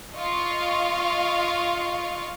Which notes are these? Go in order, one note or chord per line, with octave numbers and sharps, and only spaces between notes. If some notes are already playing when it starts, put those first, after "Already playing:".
F4 D#5 F5 C#6